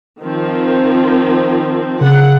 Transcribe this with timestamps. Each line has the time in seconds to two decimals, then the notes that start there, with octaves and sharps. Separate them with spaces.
0.22 D#3 F3 C4
2.01 C#3 F#5